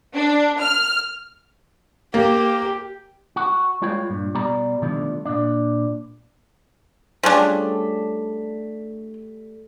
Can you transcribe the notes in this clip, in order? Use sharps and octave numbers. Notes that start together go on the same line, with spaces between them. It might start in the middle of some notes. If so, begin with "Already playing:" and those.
D4
F6
A#3 G4
F#4
G3 G#3 F4 B4 C#5 G5
G2 A#2
B2 G3 G4 D5 A#5 B5
B2 D3 D#3 F3 G3 A3
A#2 D4
F3 G3 A3 C#4 D4 G#4